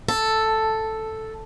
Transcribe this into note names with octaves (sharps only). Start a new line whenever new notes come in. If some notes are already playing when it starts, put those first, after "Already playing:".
A4